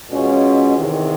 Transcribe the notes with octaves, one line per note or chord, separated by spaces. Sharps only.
B2 G#3 C#4 F4
E2 C3 D#3